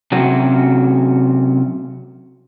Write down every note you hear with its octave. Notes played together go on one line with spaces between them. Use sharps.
C3 F#3 C#4 F#4